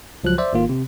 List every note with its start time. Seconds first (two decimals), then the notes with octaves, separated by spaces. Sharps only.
0.24 C#2 F3 F#3 F#6
0.38 C5 D5 E5
0.53 G#1 D#3 A#3 F4
0.69 C3